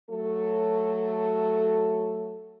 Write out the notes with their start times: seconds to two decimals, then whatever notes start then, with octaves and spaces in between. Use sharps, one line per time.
0.10 F#3 A3 A4